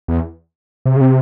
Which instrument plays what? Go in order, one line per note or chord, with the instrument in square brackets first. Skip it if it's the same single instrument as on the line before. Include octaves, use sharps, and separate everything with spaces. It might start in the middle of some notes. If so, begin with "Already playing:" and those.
[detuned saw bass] E2
C3
C#3
C3